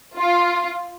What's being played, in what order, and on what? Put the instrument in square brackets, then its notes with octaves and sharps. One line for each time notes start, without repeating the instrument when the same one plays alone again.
[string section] F4